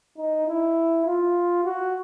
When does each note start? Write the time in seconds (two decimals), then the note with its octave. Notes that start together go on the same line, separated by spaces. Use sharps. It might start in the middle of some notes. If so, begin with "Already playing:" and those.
0.18 D#4
0.47 E4
1.06 F4
1.64 F#4